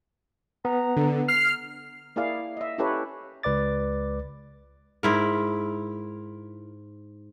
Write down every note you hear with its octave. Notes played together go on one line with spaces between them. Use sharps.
B3 A#5
D3
F6 C7
A#3 E4 G#4 D5 F5
D#5 E5
C#4 E4 G4 A4 B4 C#5
C#2 B4 D5 D6 A6
G#2 E4 A#4